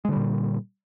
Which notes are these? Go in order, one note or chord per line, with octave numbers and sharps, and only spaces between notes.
A#2 D3 G3 G#3